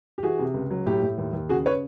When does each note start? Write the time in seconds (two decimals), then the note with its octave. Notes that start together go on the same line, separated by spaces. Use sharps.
0.18 G4
0.23 E3 F#4 G#4
0.39 C3
0.54 C#2
0.71 F#3
0.86 A2 G4
1.02 A2
1.18 D#2
1.33 D#2
1.49 C#3 F#4 G#4
1.66 B4 C#5